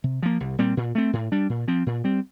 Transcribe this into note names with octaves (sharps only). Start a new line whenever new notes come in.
C3
F3 A#3
C2
A#2 G3 C4
A#2
A3 C4
A2
G3 D4
A#2
F3 C4
A#2
G3 C4